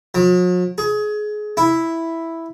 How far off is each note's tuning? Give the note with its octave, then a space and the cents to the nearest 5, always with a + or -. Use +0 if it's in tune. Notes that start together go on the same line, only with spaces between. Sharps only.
F#3 -45
G#4 +25
E4 +0